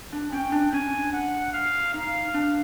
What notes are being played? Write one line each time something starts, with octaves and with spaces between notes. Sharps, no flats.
D4
C#4 G5
D4
C#4 G#5
D4
F#5
F5
D#4 F5
D4